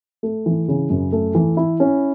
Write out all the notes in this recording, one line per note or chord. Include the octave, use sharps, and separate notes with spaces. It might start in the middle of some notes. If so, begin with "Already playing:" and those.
A3
E3
C#3
F#2
A3
E3
E4
C#4